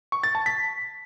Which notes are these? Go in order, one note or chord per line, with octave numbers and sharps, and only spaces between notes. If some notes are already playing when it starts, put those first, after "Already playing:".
C#6
A6
A5
B6